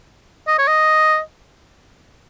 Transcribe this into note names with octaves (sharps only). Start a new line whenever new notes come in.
D#5
C#5
D#5